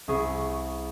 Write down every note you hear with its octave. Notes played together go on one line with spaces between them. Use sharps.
C2 G#4 C#6